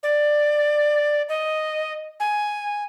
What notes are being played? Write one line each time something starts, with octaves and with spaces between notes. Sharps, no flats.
D5
D#5
G#5